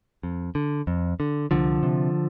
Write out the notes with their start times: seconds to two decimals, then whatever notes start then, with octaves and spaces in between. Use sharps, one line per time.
0.23 F2
0.55 D3
0.87 F2
1.20 D3
1.51 C2 D3 F3
1.83 C3